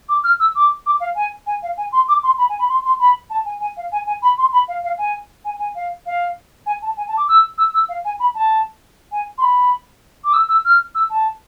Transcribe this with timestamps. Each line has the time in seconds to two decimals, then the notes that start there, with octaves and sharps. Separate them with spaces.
0.09 D6
0.24 F6
0.40 E6
0.56 D6
0.86 D6
1.00 F5
1.16 G#5
1.47 G#5
1.63 F5
1.77 G#5
1.92 C6
2.09 D6
2.23 C6
2.38 B5
2.49 G#5
2.59 B5
2.69 C6
2.85 C6
3.00 B5
3.30 A5
3.45 G#5
3.60 G#5
3.77 F5
3.92 G#5
4.07 G#5
4.22 B5
4.38 C6
4.53 B5
4.68 F5
4.84 F5
4.98 G#5
5.45 G#5
5.59 G#5
5.75 F5
6.06 F5
6.66 G#5
6.82 A5
6.97 G#5
7.08 A5
7.17 D6
7.28 E6
7.58 E6
7.74 E6
7.89 F5
8.05 G#5
8.20 B5
8.35 A5
9.12 G#5
9.38 C6
9.42 B5
10.24 D6
10.33 E6
10.49 E6
10.65 F6
10.95 E6
11.10 A5